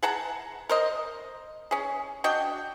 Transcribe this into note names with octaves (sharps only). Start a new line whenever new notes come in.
G#4 F#5 A5 A#5
A#4 C5 D#5
C#4 G#4
D4 F#4 D#5 G5